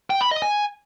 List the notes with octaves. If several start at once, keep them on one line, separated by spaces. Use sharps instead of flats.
G5
B5
D#5
G#5